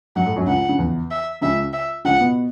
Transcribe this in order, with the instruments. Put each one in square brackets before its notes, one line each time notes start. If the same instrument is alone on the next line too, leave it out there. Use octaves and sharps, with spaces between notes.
[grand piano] F#2 F#3 [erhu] F#5
[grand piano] A2 A3
F#2 F#3
[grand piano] C#2 C#3 [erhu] F#5
[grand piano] C#3
E2 E3
[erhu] E5
[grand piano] C#2 C#3 [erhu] E5
[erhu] E5
[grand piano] C#2 C#3 [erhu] F#5
[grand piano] B2 B3